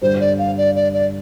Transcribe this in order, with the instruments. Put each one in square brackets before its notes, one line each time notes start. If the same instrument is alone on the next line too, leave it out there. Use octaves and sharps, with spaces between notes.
[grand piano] G2 D3 G3 [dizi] C5
[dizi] D5
F5
D5
D5
D5